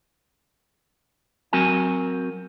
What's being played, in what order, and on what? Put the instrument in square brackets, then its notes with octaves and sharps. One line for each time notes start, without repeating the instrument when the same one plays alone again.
[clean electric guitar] F#3 C4 F#4 A#4 G#5